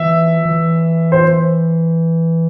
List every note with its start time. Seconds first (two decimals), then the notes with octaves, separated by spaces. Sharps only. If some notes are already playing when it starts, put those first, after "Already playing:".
Already playing: E3 E5
0.45 E3
1.12 C5